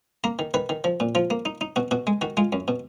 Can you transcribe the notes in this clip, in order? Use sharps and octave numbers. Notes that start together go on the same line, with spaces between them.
A#3 A#4
D#3
D#3 B4
D#3
F3
A#2
F3 F4
A#3
D#4
D#4
B2 F#4
B2 F#4
G#3
D#3 F#4
G#3 F4
F#2
B2